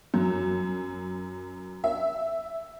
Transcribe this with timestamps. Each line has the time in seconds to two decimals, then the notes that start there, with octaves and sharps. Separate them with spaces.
0.14 F#2
1.84 E5